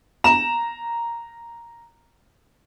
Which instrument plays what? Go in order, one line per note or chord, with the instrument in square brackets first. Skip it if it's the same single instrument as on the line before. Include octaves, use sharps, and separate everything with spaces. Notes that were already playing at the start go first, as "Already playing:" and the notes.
[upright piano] A#5 E7